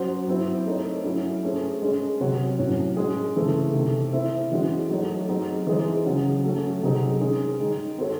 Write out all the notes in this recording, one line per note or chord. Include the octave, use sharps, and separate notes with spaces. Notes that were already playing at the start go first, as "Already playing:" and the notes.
Already playing: F#3 C#4 F#4 C5
F#3 C4 E4 C5
A3 D#4 A4 C#5
F#3 C#4 E4
A3 C#4 G#4 C5
G#3 C#4 G#4
C3 F#3 C4 F#4 C#5
A2 F#3 C#4 F#4 C#5
G#3 C#4 G#4
C#3 E3 A3 C4
C3 D#3 A3
C4 E4 C5 E5
E3 G#3 C#4 F#4
F#3 A3 D#4 F#4 C#5
F#3 C4 D#4 G#4
E3 G#3 D#4 G#4 C5
C#3 F#3 C#4
F#3 A3 C#4
C3 F#3 C4 D#4 G#4
D#3 G#3 C#4 G#4
D#3 G#3 D#4
C4 F#4 A4 C#5